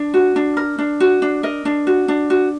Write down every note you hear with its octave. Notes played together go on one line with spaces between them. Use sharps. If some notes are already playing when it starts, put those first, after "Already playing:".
Already playing: D4
F#4
D4
A#4
D4
F#4
D4
A#4 D#5
D4
F#4
D4
F#4